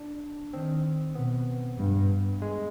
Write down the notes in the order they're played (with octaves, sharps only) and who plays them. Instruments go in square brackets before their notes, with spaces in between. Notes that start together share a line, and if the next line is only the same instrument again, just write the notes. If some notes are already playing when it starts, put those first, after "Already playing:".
Already playing: [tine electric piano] D4
[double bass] D#3 [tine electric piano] C4
[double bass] B2 [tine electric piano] B3
[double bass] G2
[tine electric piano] G#3